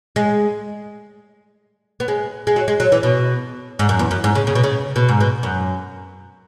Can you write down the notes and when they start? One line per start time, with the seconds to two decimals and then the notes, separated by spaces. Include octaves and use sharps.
0.16 G#3
2.00 B3
2.08 G#3
2.47 G#3
2.56 F#3
2.68 G#3
2.80 F#3
2.92 E3
3.03 B2
3.79 G#2
3.89 F#2
3.99 E2
4.11 F#2
4.24 G#2
4.35 C#3
4.47 C#3
4.55 B2
4.64 C#3
4.96 B2
5.09 G#2
5.20 B2
5.43 F#2